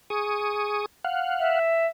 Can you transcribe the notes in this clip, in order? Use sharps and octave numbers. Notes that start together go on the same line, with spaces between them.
G#4 C#6 D#6
F5 F#5
E5